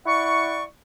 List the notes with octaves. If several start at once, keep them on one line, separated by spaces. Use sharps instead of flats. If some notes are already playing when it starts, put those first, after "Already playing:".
E4 D5 F#5 C#6